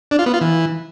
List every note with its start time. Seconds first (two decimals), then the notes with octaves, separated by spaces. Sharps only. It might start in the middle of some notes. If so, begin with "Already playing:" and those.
0.11 D4
0.19 F4
0.26 B3
0.34 F4
0.41 E3